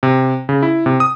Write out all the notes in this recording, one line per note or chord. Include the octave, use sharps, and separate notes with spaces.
C3
C#3
E4
C3
D#6